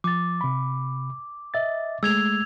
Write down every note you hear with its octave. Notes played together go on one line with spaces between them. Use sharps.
F3 D6 A6
C3 B5
D#5 E5 A6
G#3 A3 E6 G#6 F7